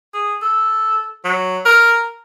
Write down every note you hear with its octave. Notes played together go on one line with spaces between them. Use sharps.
G#4
A4
F#3
A#4